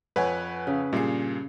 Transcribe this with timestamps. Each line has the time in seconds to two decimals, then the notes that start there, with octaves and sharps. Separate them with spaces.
0.16 F2 B4 C#5 F#5 G#5
0.67 C#3
0.93 G2 A#2 G#4 C7